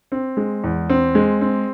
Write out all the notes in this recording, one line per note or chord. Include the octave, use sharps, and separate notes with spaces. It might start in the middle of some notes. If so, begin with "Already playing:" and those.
C4
G#3
E2
C4
G#3
C4